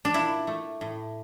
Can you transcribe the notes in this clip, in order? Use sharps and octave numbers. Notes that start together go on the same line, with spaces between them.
D4
A#2 E4
A3
A2